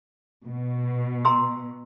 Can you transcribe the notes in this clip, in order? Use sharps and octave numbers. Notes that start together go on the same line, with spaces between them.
B2
A#5 C6 E6